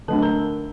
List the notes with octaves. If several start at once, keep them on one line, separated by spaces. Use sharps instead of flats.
D3 F#3 A3 D4 A4 A5
A#4 A#5